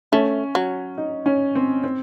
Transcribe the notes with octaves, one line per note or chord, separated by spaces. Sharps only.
A3 C#4
F#3
D#4
C#4
C4
C4